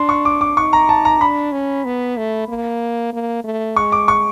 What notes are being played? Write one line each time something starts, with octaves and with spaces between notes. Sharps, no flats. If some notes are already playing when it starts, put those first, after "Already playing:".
Already playing: D4 C6
C#6
D6
D6
D#4 C#6
A#5
A5
A#5
D4 B5
C#4
B3
A3
A#3
A#3
A3
G#3 C#6
D6
C#6